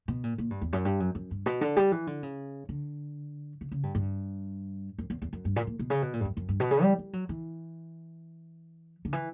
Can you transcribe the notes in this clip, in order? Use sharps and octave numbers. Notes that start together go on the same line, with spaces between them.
B2
A#2
A#2
G2
E2
F#2
G2
F#2
F#2
G2
B2
D3
G3
E3
D3
C#3
D3
C#3
C#3
G2
G2
F#2
E2
E2
F#2
G2
A#2
A#2
B2
C#3
B2
A#2
G2
F#2
F#2
G2
B2
C#3
G3
G3
F#3
E3
D3
E3